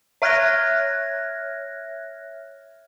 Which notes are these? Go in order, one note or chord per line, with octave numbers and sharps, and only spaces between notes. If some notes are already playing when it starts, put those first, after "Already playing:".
C#5 E5 F6 F#6 G#6 A#6